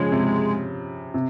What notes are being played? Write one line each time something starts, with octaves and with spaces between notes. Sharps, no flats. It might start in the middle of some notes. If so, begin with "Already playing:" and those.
Already playing: C#3 F3 G#3
C3
C3